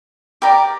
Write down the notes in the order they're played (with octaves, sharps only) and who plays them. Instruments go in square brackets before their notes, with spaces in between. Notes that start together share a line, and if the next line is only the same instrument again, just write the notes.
[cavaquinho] G4 A#4 D5